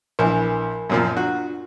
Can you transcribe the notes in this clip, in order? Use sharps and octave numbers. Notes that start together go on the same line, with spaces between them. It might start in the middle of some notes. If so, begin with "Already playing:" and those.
A#1 E3 A#4 G#5 B5
F#2 A#2 F3
D4 F4 F#4 F#5